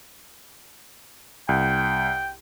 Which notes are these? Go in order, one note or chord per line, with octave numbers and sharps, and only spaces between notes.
C2 G5